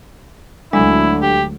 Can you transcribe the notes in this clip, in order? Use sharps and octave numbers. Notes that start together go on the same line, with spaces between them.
D2 D3 F#3 G#3 E4
G4